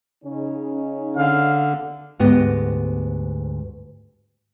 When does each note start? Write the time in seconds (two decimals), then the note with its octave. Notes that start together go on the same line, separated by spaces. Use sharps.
0.24 C#3 C#4 D#4
1.17 D3 F5
2.19 D2 G#2 B3 G4 D#5